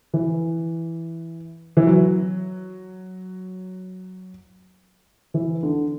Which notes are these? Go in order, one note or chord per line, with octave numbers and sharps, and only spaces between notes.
E3
E3
F#3
E3
D3